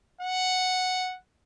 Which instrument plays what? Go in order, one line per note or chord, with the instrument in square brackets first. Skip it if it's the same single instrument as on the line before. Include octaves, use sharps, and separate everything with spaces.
[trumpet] F#5